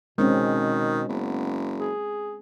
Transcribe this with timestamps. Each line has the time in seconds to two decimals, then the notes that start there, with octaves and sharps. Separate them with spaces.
0.18 B2 D#3 G#3 C4 C#4
1.09 F#1 B3
1.79 G#4